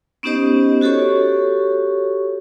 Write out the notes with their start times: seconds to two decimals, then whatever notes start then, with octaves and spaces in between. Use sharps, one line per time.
0.23 B3 C#4 D#4 G4 C5 D#5
0.81 F#4 G4 A4 C#5 C#6